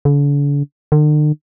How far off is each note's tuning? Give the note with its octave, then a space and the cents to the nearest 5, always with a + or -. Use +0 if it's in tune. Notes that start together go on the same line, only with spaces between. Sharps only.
D3 -45
D3 +45